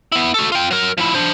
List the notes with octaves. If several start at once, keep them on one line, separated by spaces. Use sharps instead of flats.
B3 E4
F#4 A4
F4 G5
F#3 A#4
F3 E4
D4 C5